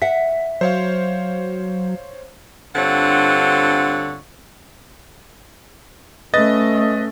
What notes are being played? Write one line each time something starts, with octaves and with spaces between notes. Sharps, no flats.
E5 F#5 B6
F#3 C5 C#5 F5
G2 D3 C4 F4 C#5 F#5
A3 C#4 B4 D#5 A6